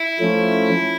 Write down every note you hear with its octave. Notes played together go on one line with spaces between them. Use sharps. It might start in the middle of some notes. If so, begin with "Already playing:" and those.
Already playing: E4
F3 A3 C#4